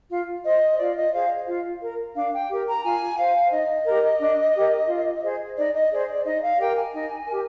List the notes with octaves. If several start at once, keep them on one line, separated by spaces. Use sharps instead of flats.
F4
C5 D#5
F4 D5
D#5
G#4 C5 F5
F4
A#4
D4 F5
G5
G4 A#4
A#5
F4 G#5
C5 F5
D#4 D#5
G4 A#4
D4
G4 A#4
F4
G#4 C5
D#4 D5
D#5
G#4 C5 D5
D5
D#4 D#5
F5
G4 A#4 G5
G#5
D#4
G4 A#4